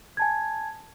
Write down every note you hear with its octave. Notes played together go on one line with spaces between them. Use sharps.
G#5 A5 G#6